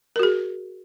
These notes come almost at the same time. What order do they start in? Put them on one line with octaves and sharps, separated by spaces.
A#4 F#4 G#4